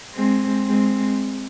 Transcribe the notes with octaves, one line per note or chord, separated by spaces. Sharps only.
G#3 C4
G#3 C4